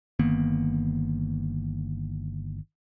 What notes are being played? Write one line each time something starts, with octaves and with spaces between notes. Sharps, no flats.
G1 D#3 A#3 B3